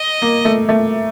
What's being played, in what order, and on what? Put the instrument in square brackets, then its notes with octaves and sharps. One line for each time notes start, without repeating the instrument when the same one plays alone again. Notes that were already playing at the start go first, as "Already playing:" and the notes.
Already playing: [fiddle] D#5
[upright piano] A#3
A3
A3